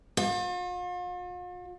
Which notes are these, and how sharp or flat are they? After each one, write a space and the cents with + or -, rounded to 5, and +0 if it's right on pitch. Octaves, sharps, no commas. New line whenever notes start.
F4 +45